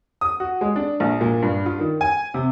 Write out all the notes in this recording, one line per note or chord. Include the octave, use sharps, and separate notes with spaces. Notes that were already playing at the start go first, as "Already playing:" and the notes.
D#6
F#4
G#3
D4
A#1
A#2
G2
F4
D#3
G#5
C3